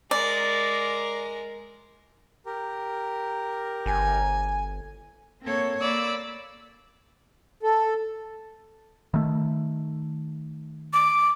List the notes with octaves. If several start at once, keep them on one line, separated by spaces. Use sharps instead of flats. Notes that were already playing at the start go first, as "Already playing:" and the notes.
G#3 A#4 D5
G4 A#4
G1 G#5
A#3 C4 A4 C#5
A#3 D5 B5 E6
A4
D#3 A3
D6